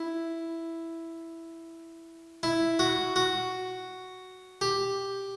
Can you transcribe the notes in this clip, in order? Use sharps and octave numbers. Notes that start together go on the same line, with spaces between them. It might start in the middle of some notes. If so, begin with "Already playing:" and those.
Already playing: E4
E4
F#4
F#4
G4